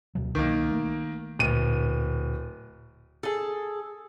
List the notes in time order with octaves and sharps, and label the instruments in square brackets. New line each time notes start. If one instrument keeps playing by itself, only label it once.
[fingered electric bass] D2 B2 F#3
[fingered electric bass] C2 [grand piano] D#3 A#3
[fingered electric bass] A3
[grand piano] D1 D#7 [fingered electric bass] D2 A#2
[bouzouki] G#4 A4